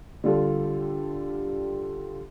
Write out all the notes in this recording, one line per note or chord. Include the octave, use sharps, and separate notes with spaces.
D3 G3 F4 A4